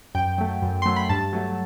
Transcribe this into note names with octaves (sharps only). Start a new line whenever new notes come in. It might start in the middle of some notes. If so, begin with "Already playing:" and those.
F#2 G5
F#3 A3
F#2
F#3 A3 C6
B5
G2 A5
F#3 A3